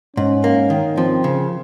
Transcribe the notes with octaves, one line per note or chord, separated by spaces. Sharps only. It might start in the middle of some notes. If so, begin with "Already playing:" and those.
G#2 C#4
A#3
D#3
F3 C4
C#3